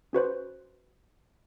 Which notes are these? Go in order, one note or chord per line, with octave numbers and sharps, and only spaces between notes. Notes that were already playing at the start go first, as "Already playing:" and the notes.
C#4 F#4 B4 C5